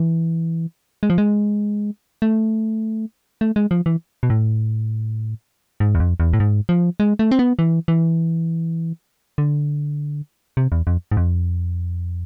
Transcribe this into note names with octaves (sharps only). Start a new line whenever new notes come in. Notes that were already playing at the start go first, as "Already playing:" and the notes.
Already playing: E3
G#3
F3
G#3
A3
A3
G#3
F3
E3
B2
A2
G#2
E2
F2
E2
A2
G#2
F3
G#3
A3
C4
B3
E3
E3
D3
C3
E2
F2
G#2
F2